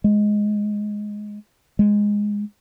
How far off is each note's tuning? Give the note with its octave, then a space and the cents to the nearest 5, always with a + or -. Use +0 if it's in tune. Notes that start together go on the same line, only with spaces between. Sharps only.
G#3 +5
G#3 -5